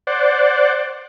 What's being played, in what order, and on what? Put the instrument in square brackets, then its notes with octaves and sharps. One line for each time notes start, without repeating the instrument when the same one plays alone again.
[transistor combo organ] C5 D5 F#5